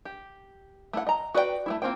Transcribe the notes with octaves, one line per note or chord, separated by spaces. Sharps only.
G4
A3 E4 F#5
D#5 A#5
F#4 B4 D5 D#5 G5
A3 C4 E4
A#3 C4 F4 C5 G5